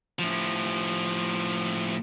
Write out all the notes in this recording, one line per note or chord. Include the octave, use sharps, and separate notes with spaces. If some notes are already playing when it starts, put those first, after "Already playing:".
A2 F3